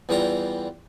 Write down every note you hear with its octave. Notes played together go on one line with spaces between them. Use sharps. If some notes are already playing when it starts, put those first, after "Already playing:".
E2 E3 G3 F4 A#5